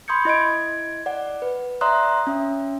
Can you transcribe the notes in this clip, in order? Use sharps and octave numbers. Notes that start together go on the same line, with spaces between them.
B5 C6 D#6 G6 G#6 C#7
E4 D#5 G#6 D7
D5 F#5
B4
D5 E5 A#5 C6 D#6 F#6
C#4 E5